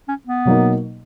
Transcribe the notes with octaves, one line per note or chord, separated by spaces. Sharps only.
C#4
B3
B2 F#3 A#3 D#4